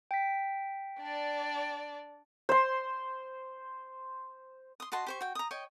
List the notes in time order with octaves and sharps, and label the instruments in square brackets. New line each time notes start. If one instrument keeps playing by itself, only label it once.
[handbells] G5 B6
[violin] D4 D5
[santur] C5 C6
[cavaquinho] C6 D#6
F#4 D#5 A5 C6
G4 C5 C#6
F#4 G5
A#5 D#6
C#5 D#5 G5